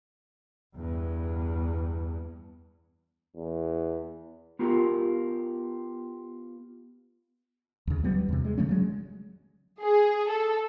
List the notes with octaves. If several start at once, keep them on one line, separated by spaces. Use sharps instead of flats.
E2 G2
E2
B3 F4 G4 A#4
D#2 C#3
F#3 G3 B3
E2 C3
G#3
C#3 F3 A3 C#4
F#3 G#3
G#4
A4